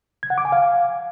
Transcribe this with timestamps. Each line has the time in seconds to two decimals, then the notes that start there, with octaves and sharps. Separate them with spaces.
0.23 G#6
0.30 F#5
0.38 D6
0.45 G#5
0.52 F5